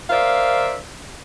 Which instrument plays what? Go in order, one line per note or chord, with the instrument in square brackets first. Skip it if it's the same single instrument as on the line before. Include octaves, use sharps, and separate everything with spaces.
[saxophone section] A#4 C5 D5 E5 F5